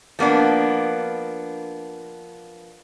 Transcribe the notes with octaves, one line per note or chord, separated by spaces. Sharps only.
F3 A#3 B3 D4